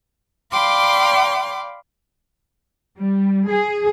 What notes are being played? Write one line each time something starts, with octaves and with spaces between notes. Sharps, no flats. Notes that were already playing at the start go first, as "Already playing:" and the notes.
D5 F5 G5 B5 C6 D6
G3
G#4